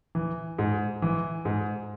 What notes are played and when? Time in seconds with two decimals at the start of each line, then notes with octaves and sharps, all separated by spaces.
0.15 E3
0.59 G#2
1.02 E3
1.45 G#2